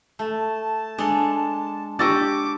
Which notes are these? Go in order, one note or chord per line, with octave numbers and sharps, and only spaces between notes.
A3 A5
G#3 D4 A4
D4 G4 D#5 C#6 D6 E6 A6